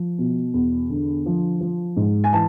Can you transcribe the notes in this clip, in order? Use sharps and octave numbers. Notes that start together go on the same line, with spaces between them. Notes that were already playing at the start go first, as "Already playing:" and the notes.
Already playing: F3
B2
E2
D3
F3
F3
G#2
G#5
E3 A5